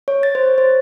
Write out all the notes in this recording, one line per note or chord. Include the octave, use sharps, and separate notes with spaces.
C#5
A6
C5
C5